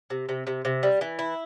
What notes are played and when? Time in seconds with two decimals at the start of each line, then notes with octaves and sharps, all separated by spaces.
0.10 C3
0.29 C3
0.47 C3
0.65 C3
0.83 G3
1.01 E3
1.19 E4